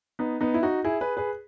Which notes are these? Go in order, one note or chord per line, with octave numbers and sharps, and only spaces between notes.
B3 D#4
B3 D#4
E4
D#4 F#4
E4 G#4
G#4 B4
G#4 B4